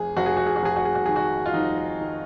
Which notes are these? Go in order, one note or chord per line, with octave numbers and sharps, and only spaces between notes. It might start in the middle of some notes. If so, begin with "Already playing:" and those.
Already playing: F1 G#4
F1 F#4
G#4
F#4
G#4
F#4
F1 G#4
F#4
G#4
F#4
D#3 G#4
F#4
F4
F1 D#4
D#3